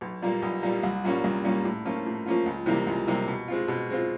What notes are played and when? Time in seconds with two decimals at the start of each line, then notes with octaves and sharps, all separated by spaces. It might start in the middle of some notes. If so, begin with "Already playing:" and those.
0.01 B1
0.22 A#2 G3 A#3
0.42 B1
0.63 A#2 G3 A#3
0.83 C2
1.04 A#2 G3 A#3 C#4
1.24 C2
1.44 A#2 G3 A#3 C#4
1.65 A2
1.85 F3 A#3 C#4 F4
2.06 A2
2.26 F3 A#3 C#4 F4
2.46 C#2
2.66 C3 E3 G3 A#3
2.87 C#2
3.07 C3 E3 G3 A#3
3.28 B2
3.48 G#3 C4 F4
3.68 B2
3.90 G#3 C4 F4